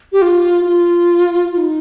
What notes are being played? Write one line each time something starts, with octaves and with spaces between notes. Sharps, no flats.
G4
F4
F4
F4
D#4